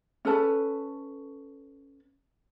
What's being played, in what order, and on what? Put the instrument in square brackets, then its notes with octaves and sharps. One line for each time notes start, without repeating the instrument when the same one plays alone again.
[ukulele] C#4 A4 B4 A5